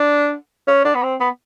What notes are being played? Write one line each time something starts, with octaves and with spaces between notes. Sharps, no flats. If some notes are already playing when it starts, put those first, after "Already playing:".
Already playing: D4
C#4
D4
B3
C4
B3